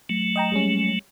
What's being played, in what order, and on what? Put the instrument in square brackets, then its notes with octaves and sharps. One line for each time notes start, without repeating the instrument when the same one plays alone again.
[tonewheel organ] F#3 A3
[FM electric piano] D#5 G5 A#5
G3 G#3 C#4